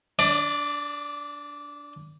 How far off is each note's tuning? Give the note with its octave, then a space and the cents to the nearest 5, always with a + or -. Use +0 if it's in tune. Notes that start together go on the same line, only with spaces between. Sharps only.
D4 -15 D5 +20